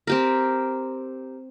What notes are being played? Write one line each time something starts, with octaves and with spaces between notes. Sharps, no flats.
C4 G4 A#4